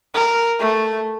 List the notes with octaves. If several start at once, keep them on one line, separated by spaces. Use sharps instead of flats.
A#4
A3